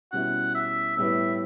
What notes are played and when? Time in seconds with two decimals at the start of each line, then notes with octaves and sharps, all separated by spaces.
0.12 B2 G3 C#4 E4 F#5
0.55 E5
0.97 A2 G3 B3 E4 E5